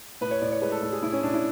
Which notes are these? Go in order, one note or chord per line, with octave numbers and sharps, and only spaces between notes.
A2 B4
C#5
A2 D5
C#5
G#3 B4
A4
A2 A4
G#4
A2 E4
C#4
A2 D4
E4